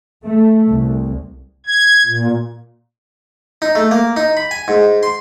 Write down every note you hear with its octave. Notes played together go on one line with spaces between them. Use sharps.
A3
C2
G#6
A#2
D#4
A3
A#3
D#4
B5
G#5
G#2
C6